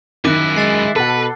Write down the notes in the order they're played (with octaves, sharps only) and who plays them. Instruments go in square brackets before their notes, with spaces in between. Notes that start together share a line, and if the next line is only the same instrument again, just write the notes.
[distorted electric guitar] F#2 E4 [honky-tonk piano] D#3 [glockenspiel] D6 F#6
[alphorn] G#3 [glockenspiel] E6 A6 C7
[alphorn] B2 [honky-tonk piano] A4 F#5 [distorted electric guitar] B4